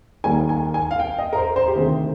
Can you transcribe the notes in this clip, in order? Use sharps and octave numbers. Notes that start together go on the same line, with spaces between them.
D#2 D#3 G3 A#3 G#5
G#5
G#5
F5
G5
D#5
A#4
C5
C5
G4
D2 C3 D#3 G#4